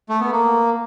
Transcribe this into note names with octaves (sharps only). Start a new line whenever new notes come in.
A3
B3
A#3